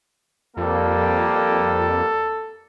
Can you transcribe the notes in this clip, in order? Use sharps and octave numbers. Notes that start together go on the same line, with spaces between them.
F2 G3 A#3 A4